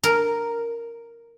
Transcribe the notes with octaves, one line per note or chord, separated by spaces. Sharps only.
A#4